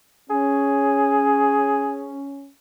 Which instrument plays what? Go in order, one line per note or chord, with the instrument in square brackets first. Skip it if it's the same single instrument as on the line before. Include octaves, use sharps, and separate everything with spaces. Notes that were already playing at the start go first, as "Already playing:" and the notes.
[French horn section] C#4 [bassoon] G#4